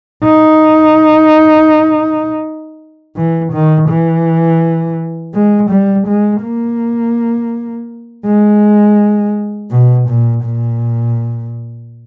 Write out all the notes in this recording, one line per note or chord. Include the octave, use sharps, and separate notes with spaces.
D#4
E3
D#3
E3
G#3
G3
G#3
A#3
G#3
B2
A#2
A#2